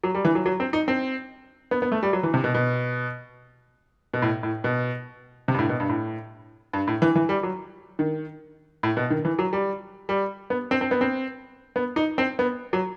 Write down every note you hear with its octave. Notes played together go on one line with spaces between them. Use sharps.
F#3
G3
E3
F#3
F#3
C4
D#4
C4
B3
B3
A3
G3
F#3
E3
C3
B2
B2
B2
A2
A2
B2
C3
G2
A2
B2
G2
A2
G2
A2
E3
E3
G3
F#3
D#3
A2
B2
D#3
E3
F#3
G3
G3
B3
C4
C4
B3
C4
B3
D#4
C4
B3
F#3